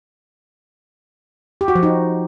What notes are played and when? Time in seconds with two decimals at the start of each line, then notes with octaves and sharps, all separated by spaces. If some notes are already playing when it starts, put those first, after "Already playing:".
1.61 G4
1.68 F#4
1.75 F3
1.83 D#4